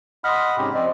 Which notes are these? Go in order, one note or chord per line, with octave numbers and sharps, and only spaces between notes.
D#5 F#5 B5 C6 F6
G#2 C3 C#4 G4 G#4
F3 C4 D5 D#5